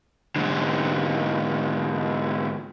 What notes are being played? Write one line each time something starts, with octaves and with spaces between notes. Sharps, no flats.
G#2 D3